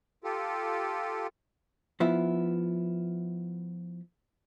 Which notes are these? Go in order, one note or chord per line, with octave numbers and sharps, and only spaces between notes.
F4 G4 A4
F3 B3 E4